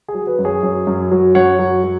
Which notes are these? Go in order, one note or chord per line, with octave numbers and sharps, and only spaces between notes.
G#4
F#3
B4
F#2
G#4 C#5
F#2
F#2
F#3
F#2 C#5 F#5
F#3
F#3